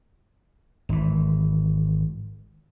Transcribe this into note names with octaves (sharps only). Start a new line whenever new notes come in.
G#1 E3